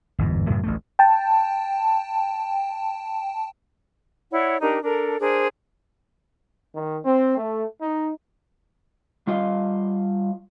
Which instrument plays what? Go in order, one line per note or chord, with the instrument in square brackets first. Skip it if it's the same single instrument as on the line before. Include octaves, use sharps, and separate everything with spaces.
[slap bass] G1 E2 G#2
F#2 A2 C#3
A1 D2 A3
[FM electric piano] G5 A5
[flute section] E4 C#5 D5 F#5
D4 D#4 G4 A#4
D4 A4 A#4
D4 G#4 A#4 C5
[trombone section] D#3
C4
A3
D#4
[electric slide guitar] G3 F4 D#5 F5